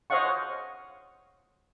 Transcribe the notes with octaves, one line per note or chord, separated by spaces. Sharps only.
C5 C#5 D#5 F5 F#5 C#6